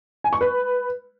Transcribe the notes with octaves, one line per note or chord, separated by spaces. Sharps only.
G#5
C#6
B4